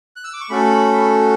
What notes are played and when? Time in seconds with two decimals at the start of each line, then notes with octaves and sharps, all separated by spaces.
0.16 F#6
0.24 E6
0.33 D6
0.41 C#6
0.50 A3 C#4 F#4 A4 B5